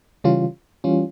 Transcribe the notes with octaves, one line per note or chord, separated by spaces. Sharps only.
C#3 E3 G3 C#4 F4
E3 G3 C#4 F4